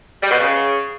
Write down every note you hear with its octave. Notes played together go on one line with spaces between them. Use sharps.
G3
B2
C#3